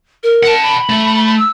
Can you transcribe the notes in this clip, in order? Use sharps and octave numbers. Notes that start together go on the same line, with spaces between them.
A#4
F#5 A5
B5
A3
E6